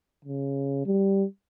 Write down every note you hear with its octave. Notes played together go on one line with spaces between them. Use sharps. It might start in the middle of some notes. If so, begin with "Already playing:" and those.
C#3
G3